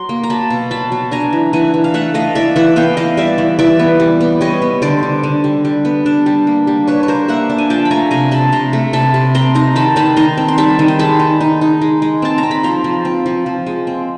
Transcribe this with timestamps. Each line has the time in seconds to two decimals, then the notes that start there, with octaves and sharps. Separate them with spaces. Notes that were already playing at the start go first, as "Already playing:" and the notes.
Already playing: F#3 C6
0.09 A#3
0.23 A#5
0.30 F#3 A5 B5
0.50 B2
0.71 F#3 A5 B5
0.92 F#3
1.11 D4 G#5 A#5
1.33 E3
1.53 E3 F#5 G#5
1.74 E3
1.84 F5
1.94 A3 E5 F#5
2.14 A3 D#5 F5
2.35 E3 D5 E5
2.56 E3 E5 F#5
2.76 B3 F5 G5
2.97 E3 D#5 F5
3.17 G3 D5 E5
3.38 E3
3.59 E3 D5 E5
3.79 B3
4.00 G3
4.21 B3
4.41 G3 C#5 D#5
4.62 B3
4.82 D3 C5 D5
5.03 D3
5.23 D3
5.44 G3
5.65 G3
5.85 B3
6.06 D4
6.26 G3
6.47 A#3
6.67 G3
6.87 D4 B4 C#5
7.03 C#5
7.08 D4 A#4 C5
7.28 A#3 E5 F#5
7.50 D4
7.58 G#5
7.70 F3 G5 A5
7.85 B5
7.91 A3 G#5 A#5
8.11 C3 G#5 A#5
8.31 C3 A5 B5
8.52 C3 A#5 C6
8.73 A3
8.93 C3 A5 B5
9.14 C3
9.35 C4 A#5 C6
9.55 D#4 A#5 C6
9.76 D#3 A5 B5
9.96 D#3 A5 B5
10.16 D#4 A#5 C6
10.37 C4
10.48 C6
10.58 G3 A5 B5
10.79 D#3
10.88 C6
10.99 G#3 A5 B5
11.20 D#4
11.40 D#4
11.61 D#4
11.82 G#3
12.02 G#3
12.22 C4 A5
12.38 A#5
12.43 C4
12.51 B5
12.63 F3 A#5 C6
12.84 F3
13.05 C4
13.26 F3
13.46 F3
13.66 G#3
13.87 C4